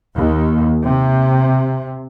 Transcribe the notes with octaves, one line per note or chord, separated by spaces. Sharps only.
D#2
C3